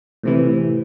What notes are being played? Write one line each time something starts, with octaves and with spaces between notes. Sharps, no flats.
A2 C3 E3